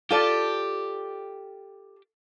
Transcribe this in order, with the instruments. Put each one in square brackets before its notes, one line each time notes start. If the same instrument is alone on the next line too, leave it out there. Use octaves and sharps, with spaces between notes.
[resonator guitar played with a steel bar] F4 A4 D5 [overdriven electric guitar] G4